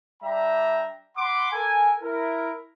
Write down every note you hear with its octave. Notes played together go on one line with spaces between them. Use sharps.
G3 D4 E5 G5 A#5
F#5 B5 C6 D6
A4 A#4 G#5
E4 A#4